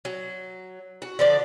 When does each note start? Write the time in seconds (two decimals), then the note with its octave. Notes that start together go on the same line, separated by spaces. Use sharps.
0.05 F#3
1.02 F#4
1.19 D3 F3 D5